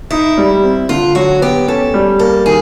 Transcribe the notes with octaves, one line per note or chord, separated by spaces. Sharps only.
D#4 E4
G3
C4
D3 F4
F#3 F#4
B3 G4
C#4 A4
G3
A#3 A4
D#3 G#4